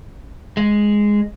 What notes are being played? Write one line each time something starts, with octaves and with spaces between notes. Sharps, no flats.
G#3